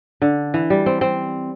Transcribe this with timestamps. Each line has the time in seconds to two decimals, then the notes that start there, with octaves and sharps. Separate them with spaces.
0.22 D3
0.54 E3
0.70 G3
0.86 C4
1.01 C4